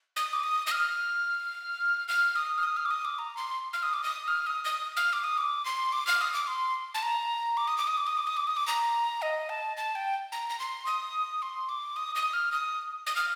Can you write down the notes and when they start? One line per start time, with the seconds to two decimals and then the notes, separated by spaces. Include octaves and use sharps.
0.16 D#6
0.33 D6
0.43 D#6
0.67 D#6
0.71 F6
2.08 F6
2.36 D#6
2.58 F6
2.63 D#6
2.77 F6
2.85 D6
2.91 D#6
3.05 D6
3.19 A#5
3.37 C6
3.73 F6
3.83 D#6
3.93 D6
4.04 D#6
4.28 F6
4.47 D#6
4.65 D#6
4.97 F6
5.13 D6
5.24 D#6
5.38 D6
5.65 C6
5.93 D6
6.07 F6
6.21 D#6
6.34 D6
6.47 C6
6.94 A5
7.03 A#5
7.57 D6
7.68 D#6
7.78 D6
7.87 D#6
7.98 D6
8.07 D#6
8.17 D6
8.27 D#6
8.37 D6
8.47 D#6
8.57 D6
8.67 A#5
9.22 D#5
9.49 A5
9.77 A5
9.95 G5
10.32 A#5
10.50 A#5
10.60 C6
10.86 D#6
11.42 C6
11.69 D6
11.96 D#6
12.15 D#6
12.33 F6
12.52 D#6
13.07 D#6
13.16 F6